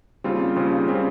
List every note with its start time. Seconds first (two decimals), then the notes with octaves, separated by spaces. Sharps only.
0.24 D#2 C#3 G3 C4 F4
0.56 D#2 C#3 G3 C4 F4
0.88 C#3 G3 C4 F4